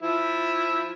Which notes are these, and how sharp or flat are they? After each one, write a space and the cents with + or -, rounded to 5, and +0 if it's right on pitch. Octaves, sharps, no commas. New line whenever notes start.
F3 +0 E4 +0